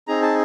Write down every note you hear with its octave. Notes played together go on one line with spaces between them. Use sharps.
C4 D#4 G#4 A#5
A5